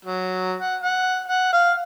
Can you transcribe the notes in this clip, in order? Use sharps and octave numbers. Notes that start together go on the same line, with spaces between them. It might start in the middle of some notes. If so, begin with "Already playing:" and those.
F#3
F#5
F#5
F#5
F5